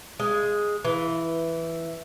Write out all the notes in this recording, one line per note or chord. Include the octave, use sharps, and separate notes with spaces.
G#3
E3